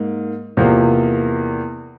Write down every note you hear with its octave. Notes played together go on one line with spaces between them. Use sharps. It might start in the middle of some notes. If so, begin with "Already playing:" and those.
Already playing: G#2 A#3
E2 C3 F3 A#3